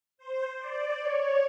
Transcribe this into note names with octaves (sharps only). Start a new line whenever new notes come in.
C5
D5
C#5